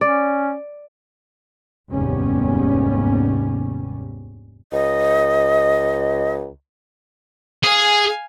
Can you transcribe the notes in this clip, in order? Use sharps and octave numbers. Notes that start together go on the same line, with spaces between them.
C#4 D5
F1 D#2 G#2 G3 B3 C#4
C#2 D#5
G#4 F5 G#5